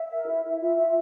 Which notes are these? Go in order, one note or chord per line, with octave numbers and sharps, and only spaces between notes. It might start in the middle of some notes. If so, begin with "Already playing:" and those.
Already playing: E5
A#4
E4
E4
F4 E5
F4 E5